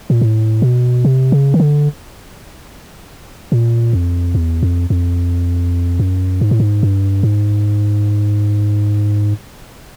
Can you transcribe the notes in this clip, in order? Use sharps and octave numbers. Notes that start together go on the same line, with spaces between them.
A#2
A2
B2
C3
C#3
D#3
D3
A#2
F2
E2
F2
F2
F#2
G#2
A2
G#2
G2
G#2